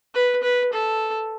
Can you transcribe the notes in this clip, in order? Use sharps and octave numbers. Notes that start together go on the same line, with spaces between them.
B4
B4
A4